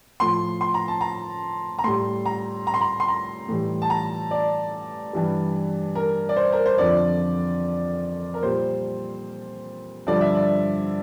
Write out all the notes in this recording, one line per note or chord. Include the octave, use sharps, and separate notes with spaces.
A2 F3 C6
C6
A#5
A5
A#5
A#5
A2 G3 C6
A#5
A#5
C6
A#5
C6
A#5
A2 E3 G3
A5
A#5
D5
G2 E3 G3
A#4
D5
C5
A#4
C5
F2 D3 F3 D5
A#4
A#2 G3 C5
G2 D3 F3 D5
E5
D5